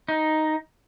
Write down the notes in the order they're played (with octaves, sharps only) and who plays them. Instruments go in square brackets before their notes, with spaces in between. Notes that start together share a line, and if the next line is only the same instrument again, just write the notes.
[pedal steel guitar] D#4